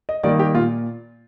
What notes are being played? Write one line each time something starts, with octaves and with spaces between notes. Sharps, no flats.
D#5
D#3 G3 A#3 D5
G4
A#2 F4